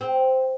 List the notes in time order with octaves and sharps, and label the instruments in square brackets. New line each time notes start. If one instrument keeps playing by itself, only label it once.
[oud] C4